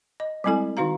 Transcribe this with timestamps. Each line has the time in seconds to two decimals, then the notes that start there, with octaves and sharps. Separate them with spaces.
0.20 D#5
0.44 G3 G#3 C4 E4 A4 G#5
0.77 D#3 D#4 F#4 F5 A#5